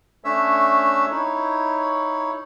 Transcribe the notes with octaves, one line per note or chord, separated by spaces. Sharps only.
A3 C#4 D4 C#5 E5 E6
D#4 E4 C#5